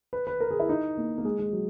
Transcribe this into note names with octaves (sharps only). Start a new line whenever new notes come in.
B4
B4
A#4
G#4
E4
D#4
A#3
A#3
G#3
G#3
F#3